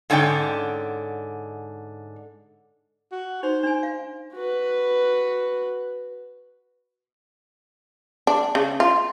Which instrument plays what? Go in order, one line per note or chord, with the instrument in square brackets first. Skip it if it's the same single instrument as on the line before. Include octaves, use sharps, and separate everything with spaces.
[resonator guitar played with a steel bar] G#2 D3 C#4 D5 G5
[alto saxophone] F#4
[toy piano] D#4 [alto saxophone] C5
[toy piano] D4 D#4 G#5
F5
[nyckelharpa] F#4 B4
[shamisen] D4
C#3
F4